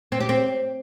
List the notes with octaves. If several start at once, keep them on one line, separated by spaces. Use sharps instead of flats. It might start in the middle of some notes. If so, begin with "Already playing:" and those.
C4
G4
C4